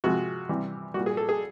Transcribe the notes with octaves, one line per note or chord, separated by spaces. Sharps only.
C3 F3 G#3 F#4
C3 E3 G3
A#2 G3 F#4
G#4
A4
G#4